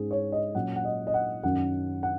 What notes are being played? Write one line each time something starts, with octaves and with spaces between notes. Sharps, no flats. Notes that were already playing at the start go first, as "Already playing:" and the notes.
Already playing: G#2 G#3 C#4 G#4
C#5
D#5
A#2 F#3 C#4 F#5
F#5
D#5
D#5
F#5
F#2 D#3 F#3 C#4 F#5
F#5